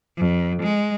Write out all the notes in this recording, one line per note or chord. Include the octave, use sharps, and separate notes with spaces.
F2
G#3